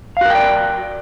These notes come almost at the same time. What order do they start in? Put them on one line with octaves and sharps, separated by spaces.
F5 F#4 A#4 G5 D5